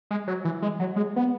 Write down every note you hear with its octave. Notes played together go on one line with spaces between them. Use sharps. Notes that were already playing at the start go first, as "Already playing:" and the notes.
G#3
F#3
E3
G#3
F#3
G#3
B3